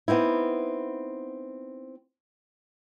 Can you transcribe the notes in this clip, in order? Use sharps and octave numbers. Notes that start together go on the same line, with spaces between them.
B3 C4 D#4 E4